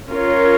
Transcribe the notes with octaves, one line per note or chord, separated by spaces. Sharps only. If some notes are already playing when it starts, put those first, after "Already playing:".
C#4 F4 A#4 C#5